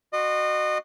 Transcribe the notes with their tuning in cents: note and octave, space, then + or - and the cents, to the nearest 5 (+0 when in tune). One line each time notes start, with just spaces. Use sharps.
F#4 +0 D#5 -30 C6 +0